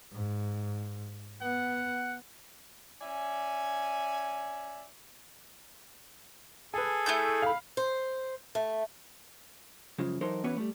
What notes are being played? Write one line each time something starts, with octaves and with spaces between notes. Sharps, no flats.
G#2
B3 F#5
C#4 D5 E5 G#5
G#4 A4 B4 G#5
A3 E4 G6
F5 B5
C5
A3
F#2 C#3 F3 G#3
E3 F#3 D#4 A4 A#4 C5
E3 B3 C#4 F#4 B4 C#5
G3 A3